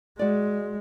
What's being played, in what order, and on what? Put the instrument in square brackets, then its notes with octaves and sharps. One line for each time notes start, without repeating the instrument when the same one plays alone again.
[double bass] G#3 [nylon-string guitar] F#4 D5